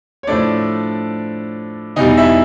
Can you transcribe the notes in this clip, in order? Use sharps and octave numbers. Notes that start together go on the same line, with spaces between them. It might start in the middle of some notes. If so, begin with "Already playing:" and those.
C#5
A2 F3 A3 D4 D5
E2 B2 G3 D#4 D#5
E4 E5